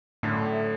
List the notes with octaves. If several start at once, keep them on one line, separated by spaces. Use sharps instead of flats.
F#2 A2 D3 A3